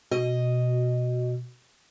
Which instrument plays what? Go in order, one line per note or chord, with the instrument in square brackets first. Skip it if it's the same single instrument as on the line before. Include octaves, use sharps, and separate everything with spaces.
[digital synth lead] B2 [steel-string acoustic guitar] D#5